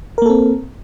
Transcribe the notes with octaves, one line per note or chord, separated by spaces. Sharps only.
A#3 C4 A4 A#4